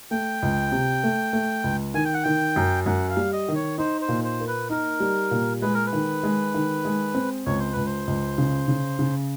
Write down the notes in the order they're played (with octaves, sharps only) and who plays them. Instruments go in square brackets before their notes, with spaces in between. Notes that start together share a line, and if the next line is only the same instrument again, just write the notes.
[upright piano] A3 [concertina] G5
[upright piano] C#2
C3
A3
A3
C#2
[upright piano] D#3 [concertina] G#5
[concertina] G5
F#5
[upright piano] D#3 [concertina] G5
[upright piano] F#2
[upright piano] F#2 [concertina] F#5
[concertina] F5
[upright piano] G3
[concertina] D#5
[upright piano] D#3
[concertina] C#5
[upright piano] D#4 [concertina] C5
[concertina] C5
[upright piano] A#2
[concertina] C5
[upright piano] A#3
[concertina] B4
[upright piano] D#4 [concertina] A#4
[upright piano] G3
A#2
[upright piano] G#3 [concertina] B4
[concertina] A#4
B4
[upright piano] D#3
G#3
D#3
G#3
C4
[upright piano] C#2 [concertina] C#5
[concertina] C5
[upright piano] C#2 [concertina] B4
[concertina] C5
[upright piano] C#2
C#3
C#3
C#3